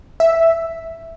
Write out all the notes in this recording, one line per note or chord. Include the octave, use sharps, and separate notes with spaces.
E5